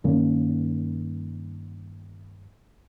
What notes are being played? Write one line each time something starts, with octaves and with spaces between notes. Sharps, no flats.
G2 D#3 A#3 C#4